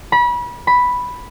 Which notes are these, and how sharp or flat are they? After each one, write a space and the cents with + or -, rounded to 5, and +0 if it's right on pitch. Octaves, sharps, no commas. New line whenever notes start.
B5 -30
B5 +0